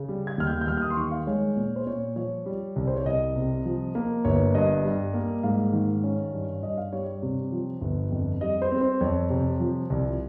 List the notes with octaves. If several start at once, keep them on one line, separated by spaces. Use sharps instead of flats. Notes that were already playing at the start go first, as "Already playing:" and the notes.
Already playing: C#3
G3
G#6
D#2 F6
G6
G6
D#2 F6
F6
D#6
C6
D#3 C#6
F5
G#3 C#5
A#2
C5
A#2 C#5
F3 C#5
G3
C2
C5
C#5
C2 D#5
C3
F3
A#3
G1 C#5
G2 D#5
G3
A#3
G#2 F5
D#3
C#4
G2
G2 D#5
F5
G3 C#5
C#5
C3
F3
G1
F2
G3 D#5
C5
C4
C5
F2 C#5
C3
F3
C2